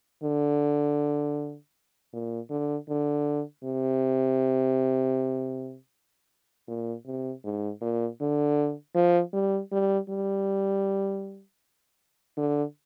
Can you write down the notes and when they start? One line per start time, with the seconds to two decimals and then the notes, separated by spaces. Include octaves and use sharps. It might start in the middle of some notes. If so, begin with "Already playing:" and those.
0.23 D3
2.13 A#2
2.50 D3
2.89 D3
3.64 C3
6.68 A#2
7.06 C3
7.44 G#2
7.81 A#2
8.20 D3
8.95 F3
9.33 G3
9.72 G3
10.09 G3
12.37 D3